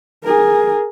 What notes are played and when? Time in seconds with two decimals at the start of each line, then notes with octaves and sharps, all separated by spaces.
0.24 G#4 A#4